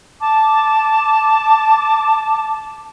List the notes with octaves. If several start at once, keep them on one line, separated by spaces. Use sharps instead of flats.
A5 D6